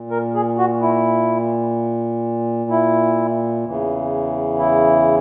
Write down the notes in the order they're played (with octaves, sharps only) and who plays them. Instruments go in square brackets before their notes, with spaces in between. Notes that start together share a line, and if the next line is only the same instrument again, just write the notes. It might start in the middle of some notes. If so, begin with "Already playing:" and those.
Already playing: [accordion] A#2
A#4
G#4
F#4
E4
E4
E2 C#3 E3
E4